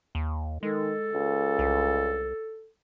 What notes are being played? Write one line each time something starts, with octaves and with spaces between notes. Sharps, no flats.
D#2
D#3 G#3 A4
C#2
C2